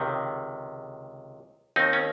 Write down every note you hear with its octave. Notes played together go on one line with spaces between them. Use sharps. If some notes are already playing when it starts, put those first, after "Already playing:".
Already playing: C#2 C3 D#3
D#2 D#3 C4 D#4
C#4